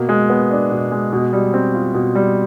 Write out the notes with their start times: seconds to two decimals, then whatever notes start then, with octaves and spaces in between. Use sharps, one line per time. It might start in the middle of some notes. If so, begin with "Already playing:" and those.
Already playing: B2 A#3
0.09 G#3
0.30 B3
0.51 D4
0.71 B2
0.91 G#3
1.12 B2
1.33 G3
1.54 C4
1.74 F4
1.94 B2
2.15 G3